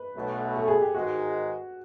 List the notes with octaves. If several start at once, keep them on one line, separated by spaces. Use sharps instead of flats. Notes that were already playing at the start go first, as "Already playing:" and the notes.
Already playing: B4
B1 B2 F#3 A3
A4
G#4
G4
G#2 D#3 G#3 F#4